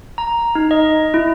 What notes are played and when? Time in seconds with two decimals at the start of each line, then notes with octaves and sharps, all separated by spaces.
0.18 A#5
0.55 D#4
0.71 D#5
1.14 E4